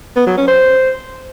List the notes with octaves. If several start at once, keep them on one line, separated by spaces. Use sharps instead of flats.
B3
F#3
C#4
C5